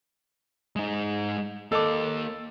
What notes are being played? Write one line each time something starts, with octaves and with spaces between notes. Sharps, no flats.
G#3 D#4
A#3 A4 D#5 D6